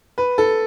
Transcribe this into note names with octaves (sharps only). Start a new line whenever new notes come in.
B4
A4